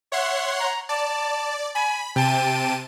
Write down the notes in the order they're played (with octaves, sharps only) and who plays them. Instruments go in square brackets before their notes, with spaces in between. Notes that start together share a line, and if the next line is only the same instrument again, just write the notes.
[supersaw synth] C#5 F#5 C6 [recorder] E5
[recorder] A#5
[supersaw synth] D5 [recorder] A5
[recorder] G#5 [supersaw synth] B5
[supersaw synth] C3 A5 D#7 [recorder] G5